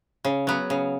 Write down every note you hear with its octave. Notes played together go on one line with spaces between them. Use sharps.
C#3
F#3 B3
C#3